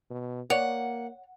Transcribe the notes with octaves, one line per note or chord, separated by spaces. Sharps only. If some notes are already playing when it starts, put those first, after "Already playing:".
B2
A#3 C#5 D5 F#5